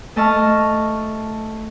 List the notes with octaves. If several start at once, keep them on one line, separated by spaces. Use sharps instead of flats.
A3 D#5 A5 C#6 F6